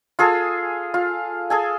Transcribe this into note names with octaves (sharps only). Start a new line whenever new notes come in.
F4 G#4 A4 G#5
F4
G#4 A4 G#5